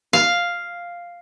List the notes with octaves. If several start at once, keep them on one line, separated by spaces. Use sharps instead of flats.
F5